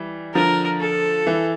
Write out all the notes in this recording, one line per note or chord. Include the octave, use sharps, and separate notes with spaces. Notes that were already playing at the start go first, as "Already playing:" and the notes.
Already playing: E3 G3
D3 F3 A#4
A4
E3